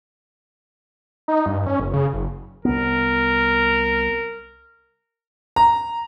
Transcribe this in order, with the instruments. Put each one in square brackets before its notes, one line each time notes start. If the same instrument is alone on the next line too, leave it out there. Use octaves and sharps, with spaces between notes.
[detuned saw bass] D#4
G2
C#4
F#1
C#3
F#1
[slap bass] C2 B3 [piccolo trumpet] A#4
[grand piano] A#5